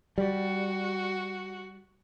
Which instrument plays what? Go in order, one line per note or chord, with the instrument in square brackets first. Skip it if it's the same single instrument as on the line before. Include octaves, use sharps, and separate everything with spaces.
[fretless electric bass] G3 [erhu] F#4